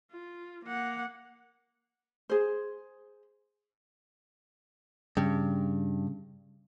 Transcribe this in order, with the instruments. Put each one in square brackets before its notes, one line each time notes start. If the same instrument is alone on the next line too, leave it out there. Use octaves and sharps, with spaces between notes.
[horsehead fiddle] F4
A#3 F#5
[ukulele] G#4 C5
[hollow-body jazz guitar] G2 [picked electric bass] C#3